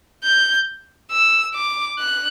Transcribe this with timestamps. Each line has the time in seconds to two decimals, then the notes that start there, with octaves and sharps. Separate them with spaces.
0.24 G6
1.11 E6
1.55 D6
1.99 F#6